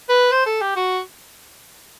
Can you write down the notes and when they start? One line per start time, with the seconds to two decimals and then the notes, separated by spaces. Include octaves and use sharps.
0.09 B4
0.31 C5
0.46 A4
0.61 G4
0.76 F#4